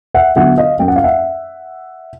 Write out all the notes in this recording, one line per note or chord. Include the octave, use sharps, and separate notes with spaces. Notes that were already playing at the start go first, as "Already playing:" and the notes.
E5 F#5
D3 F#3 B3 E5 F#5
D#5 F5
F#2 G5
F#5
F5
E5 F#5